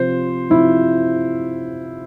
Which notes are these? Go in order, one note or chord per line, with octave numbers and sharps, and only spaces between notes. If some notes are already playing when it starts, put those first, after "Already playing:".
Already playing: C3 F3 C5
C3 F3 E4